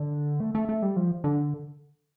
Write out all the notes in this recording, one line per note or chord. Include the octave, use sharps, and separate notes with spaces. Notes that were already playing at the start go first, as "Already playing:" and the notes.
Already playing: D3
A3
A3
A3
G3
F3
D3